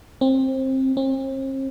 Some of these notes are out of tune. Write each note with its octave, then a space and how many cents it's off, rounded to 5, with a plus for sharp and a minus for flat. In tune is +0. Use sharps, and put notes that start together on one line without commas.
C4 +20
C4 +45